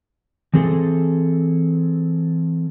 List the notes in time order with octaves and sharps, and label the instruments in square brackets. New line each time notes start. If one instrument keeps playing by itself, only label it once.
[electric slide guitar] E3 C4 G#4 A4